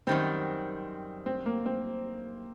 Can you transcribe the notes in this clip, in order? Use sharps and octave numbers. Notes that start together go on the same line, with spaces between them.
F#2 D#3 G3 C4
C4
A#3
C4